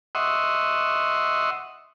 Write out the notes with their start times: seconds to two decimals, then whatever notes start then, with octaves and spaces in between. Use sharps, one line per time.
0.15 D#5 E5 F#5 C6 C#6